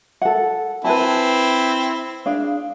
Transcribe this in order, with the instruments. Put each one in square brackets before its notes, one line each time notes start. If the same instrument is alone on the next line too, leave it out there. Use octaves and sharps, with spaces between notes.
[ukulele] A4 F#5
[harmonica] C4 E4 [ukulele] B4 G#5 A5
[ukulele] D4 G#4 F5